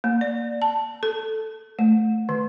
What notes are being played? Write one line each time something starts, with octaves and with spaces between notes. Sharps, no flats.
A#3
D5
A5
A4
A3
D#3